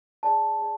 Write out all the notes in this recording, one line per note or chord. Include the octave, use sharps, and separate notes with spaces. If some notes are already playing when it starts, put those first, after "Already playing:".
G#4 D5 A5
G#4 D5